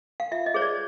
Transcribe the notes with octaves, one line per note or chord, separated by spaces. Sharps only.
F5
F4 E5
D#5
G#4 C5 C#5
D5